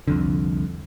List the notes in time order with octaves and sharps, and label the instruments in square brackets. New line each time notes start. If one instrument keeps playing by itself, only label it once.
[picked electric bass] C2 F2 D3